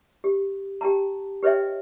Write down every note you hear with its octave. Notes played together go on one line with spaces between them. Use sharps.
G4
G4 G5 A5 A#5
G4 B4 C#5 D#5 E5 G5